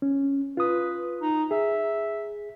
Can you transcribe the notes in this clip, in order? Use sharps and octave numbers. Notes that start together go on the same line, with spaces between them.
C#4
F4 B4 D#6
D#4
G#4 E5